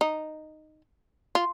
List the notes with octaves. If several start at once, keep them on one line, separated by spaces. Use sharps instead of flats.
D#4
F4